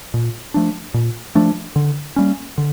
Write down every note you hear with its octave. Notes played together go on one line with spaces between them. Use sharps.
A#2
F3 A3 D4
A#2
F3 A3 D4
D3
G3 A#3 C#4
D3